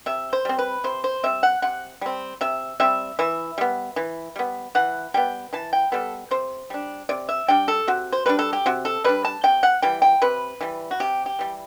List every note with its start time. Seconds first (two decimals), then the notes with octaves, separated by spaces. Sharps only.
0.06 C3 E5
0.33 C5
0.45 G3 C4
0.59 B4
0.84 C3 C5
1.04 C5
1.23 G3 C4 E5
1.43 F#5
1.62 C3 F#5
2.01 G3 C4
2.41 C3 E5
2.80 G3 C4 E5
3.19 E3 E5
3.58 G3 B3
3.96 E3
4.36 G3 B3
4.75 E3 F#5
5.14 G3 B3 G5
5.53 E3 A5
5.73 G5
5.92 G3 B3 A4
6.31 C3 C5
6.70 G3 D4
7.09 C3 D5
7.29 E5
7.48 G3 D4 G5
7.68 A4
7.88 C3 F#4
8.12 C5
8.26 G3 D4 B4
8.39 A4
8.53 G4
8.66 C3 F#4
8.85 A4
9.04 G3 D4 B4
9.25 A5
9.44 C3 G5
9.63 F#5
9.82 E3 G3 G5
10.02 G5
10.22 C3 B4
10.61 E3 G3
10.91 F#4
11.00 C3 G4
11.26 G4
11.39 E3 G3